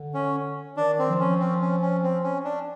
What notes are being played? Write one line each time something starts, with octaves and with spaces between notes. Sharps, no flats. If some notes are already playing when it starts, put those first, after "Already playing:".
Already playing: D3
C#4
D#3 D4
C4
F3
C#4
C4
C#4
C#4
C4
C#4
D4